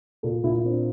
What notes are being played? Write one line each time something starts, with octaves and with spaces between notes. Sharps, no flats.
A#2 A4
A#2 E4
C4 D4